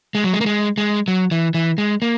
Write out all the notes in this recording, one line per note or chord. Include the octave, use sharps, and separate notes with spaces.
G#3
F#3
G#3
A#3
G#3
G#3
F#3
E3
E3
G#3
A#3